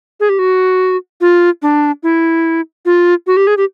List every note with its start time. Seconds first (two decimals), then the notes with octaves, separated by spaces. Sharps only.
0.20 G#4
0.29 G4
0.39 F#4
1.21 F4
1.62 D4
2.03 E4
2.85 F4
3.27 F#4
3.37 G4
3.47 G#4
3.57 G4